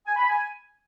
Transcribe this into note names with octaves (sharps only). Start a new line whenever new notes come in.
G#5
B5
G#5